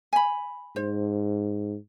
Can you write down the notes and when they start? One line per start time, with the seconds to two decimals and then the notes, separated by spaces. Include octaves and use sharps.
0.13 G#5 B5
0.76 G#2 C5